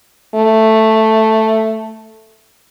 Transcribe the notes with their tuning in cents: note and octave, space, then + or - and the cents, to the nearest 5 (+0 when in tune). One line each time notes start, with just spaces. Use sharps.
A3 +5